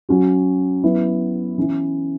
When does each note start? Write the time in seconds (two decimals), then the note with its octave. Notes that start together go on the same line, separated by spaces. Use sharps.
0.09 F#3 C#4 F#4
0.83 F#3 B3 E4
1.58 E3 C#4 E4